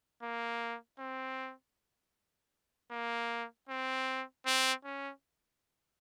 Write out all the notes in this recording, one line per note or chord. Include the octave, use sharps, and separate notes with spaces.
A#3
C4
A#3
C4
C4
C#4